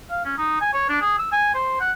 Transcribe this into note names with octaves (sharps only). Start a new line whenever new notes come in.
F5
C#4
D#4
G#5
C#5
D4
G#4
E6
G#5
C5
F#5